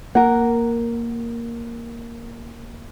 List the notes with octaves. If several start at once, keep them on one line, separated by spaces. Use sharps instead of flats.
A#3 A#4 F#5